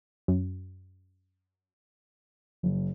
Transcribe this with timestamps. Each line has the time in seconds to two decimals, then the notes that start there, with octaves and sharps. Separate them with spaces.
0.28 F#2
2.63 F#1